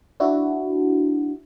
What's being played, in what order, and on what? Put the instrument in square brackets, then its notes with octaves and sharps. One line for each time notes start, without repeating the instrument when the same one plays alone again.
[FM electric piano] D4 E4 F#4